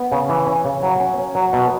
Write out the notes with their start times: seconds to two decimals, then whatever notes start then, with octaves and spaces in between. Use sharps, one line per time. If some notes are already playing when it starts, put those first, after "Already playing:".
Already playing: B3
0.12 C#3
0.29 E3
0.46 C#4
0.65 C#3
0.83 F#3
1.00 C#4
1.18 C#4
1.35 F#3
1.53 B2